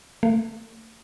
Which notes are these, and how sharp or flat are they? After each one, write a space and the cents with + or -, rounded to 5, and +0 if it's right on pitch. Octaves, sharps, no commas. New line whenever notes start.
A3 +40